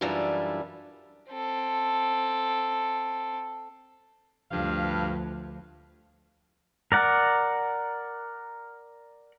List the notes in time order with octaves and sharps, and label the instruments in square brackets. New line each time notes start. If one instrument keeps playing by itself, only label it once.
[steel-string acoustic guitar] F#2 E3 G3 D4 E4 F4
[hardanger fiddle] C4 A4
[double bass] D2 F3 [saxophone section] G2 F5
[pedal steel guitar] A#4 D5 F#5